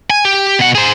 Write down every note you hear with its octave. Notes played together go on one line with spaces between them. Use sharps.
G#5
G4
B2 F#5
G#4 C5